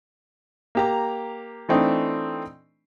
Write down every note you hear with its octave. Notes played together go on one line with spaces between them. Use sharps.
A#3 G4 A#5
E3 A3 C4 D4 D#4